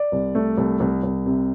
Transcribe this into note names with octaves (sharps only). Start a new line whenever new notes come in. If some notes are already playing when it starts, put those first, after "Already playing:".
Already playing: D5
C2
A3
C2
C2
C2
C3